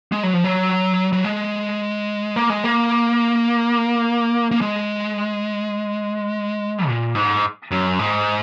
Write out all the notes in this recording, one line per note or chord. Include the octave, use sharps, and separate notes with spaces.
G#3
F#3
F3
F#3
F#3
G#3
A#3
G#3
A#3
A#3
G#3
A#2
G#2
F#2
G#2